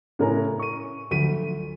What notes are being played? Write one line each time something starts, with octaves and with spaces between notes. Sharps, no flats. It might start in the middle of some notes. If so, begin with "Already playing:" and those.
A2 C#3 A#4 C#5 G#5 A#5
C#6 D#7
D2 F3 F#3 F#4 B6 D#7